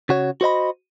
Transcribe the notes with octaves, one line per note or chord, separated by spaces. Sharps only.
C#3 F#4 C#5
F#4 C5 D#5 B5